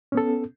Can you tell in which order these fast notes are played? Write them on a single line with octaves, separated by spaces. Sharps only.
C#4 B3 A4